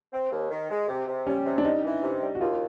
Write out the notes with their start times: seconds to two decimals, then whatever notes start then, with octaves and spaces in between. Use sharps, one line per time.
0.13 C4
0.31 D#2
0.50 D#3
0.70 G#3
0.88 C3
1.08 C3
1.27 G3 C#4
1.45 C3
1.58 D4
1.64 G3 D#4
1.84 E3
2.03 C3
2.21 G3
2.35 F#4
2.40 D#2 F4